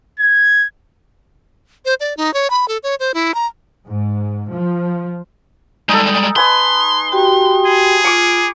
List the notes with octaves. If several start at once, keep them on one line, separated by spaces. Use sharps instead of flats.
G#6
C5
D5
D#4
C#5
B5
A4
C#5
C5
E4
A#5
G#2
F3
G3 G#3 D#4 A4
B4 G#5 A5 C6 D#6
F#4 G4 G5
G#4
F4 C#6 D6